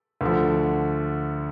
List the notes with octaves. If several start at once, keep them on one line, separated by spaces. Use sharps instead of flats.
D2 D3 F3